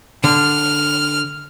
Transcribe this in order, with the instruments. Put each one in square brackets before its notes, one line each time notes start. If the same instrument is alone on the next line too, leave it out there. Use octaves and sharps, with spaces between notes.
[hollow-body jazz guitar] D3 [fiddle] F6